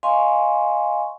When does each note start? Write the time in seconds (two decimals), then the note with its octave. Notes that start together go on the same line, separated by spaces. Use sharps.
0.03 D#5 F5 G#5 C6 C#6